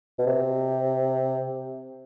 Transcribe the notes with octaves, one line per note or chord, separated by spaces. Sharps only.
B2
C3